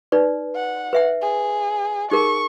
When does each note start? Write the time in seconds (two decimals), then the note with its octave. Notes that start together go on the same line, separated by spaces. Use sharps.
0.12 D#4 B4 D5
0.56 F#5
0.93 B4 E5 G5
1.22 G#4
2.11 D#4 G#4 A#4 C#6